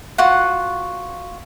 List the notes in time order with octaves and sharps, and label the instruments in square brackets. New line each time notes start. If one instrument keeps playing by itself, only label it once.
[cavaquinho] F4 F#4 F#5